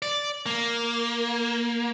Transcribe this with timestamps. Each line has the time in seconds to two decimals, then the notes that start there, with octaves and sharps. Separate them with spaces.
0.02 D5
0.46 A#3